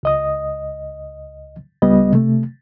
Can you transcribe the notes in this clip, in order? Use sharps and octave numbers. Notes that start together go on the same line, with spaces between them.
C#2 D#5 D#6
C#2 G3 B3 D#5
C3 A3